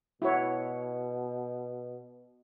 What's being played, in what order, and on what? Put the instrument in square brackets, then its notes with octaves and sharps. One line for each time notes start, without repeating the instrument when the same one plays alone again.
[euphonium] B2 [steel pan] E4 F#4 C#5